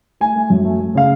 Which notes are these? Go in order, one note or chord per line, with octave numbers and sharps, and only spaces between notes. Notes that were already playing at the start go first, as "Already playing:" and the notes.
A3 G#5
A3
F#2
A3
A3
C#3 F5